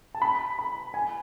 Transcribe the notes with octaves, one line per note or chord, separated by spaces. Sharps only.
A5
B5
B5
G#5